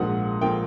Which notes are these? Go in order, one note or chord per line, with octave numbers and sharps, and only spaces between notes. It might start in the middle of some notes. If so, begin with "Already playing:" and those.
Already playing: A#1 G#2 F3 A#3 F#5
F3 A#3 G5